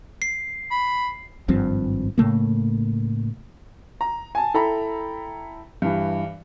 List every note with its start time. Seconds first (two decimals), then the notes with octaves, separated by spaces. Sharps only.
0.22 C7
0.71 B5
1.48 G#1 G2 F3 C4
2.18 A2 C#3 A3 A#3
4.01 A#5
4.35 G#5 A5
4.54 E4 A4 G5 A#5 B5
5.82 G2 E3